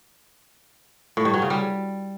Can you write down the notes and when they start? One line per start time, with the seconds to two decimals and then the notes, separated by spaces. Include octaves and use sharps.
1.17 A2
1.25 G2
1.34 F#3
1.42 C#3
1.50 G3